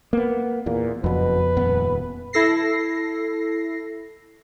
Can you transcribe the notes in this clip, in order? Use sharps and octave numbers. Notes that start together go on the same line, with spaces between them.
A#3 B3
E2 A#2 A#3
F#1 F2 B2 B4
D#1 B3
E4 A4 A#6 C7